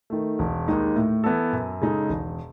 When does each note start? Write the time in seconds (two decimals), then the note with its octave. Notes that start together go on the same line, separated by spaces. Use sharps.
0.10 D#3 A3
0.39 E1
0.68 D#2 D#3 G#3 D#4
0.96 A2
1.24 E3 B3 E4 A4
1.53 F#2
1.81 C#3 G#3 D#4 A4
2.09 E1